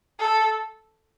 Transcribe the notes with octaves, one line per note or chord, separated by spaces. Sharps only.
A4